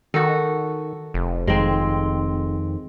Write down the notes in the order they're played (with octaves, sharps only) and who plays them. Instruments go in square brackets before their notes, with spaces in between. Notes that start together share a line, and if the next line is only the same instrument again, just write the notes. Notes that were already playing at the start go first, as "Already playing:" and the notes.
[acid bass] D#3 [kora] F#4 A4
[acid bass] F1
[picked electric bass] F2 D#3 [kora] G#3 C4